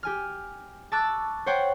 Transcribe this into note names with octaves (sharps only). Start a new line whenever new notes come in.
G4 G#5 F6
A5 C#6 D6 E6 F#6 A6
C5 C#5 F#5 G5